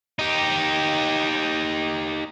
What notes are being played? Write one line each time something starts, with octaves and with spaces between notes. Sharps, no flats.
D#4 G4